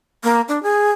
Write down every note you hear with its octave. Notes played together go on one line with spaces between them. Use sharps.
A#3
D4
G#4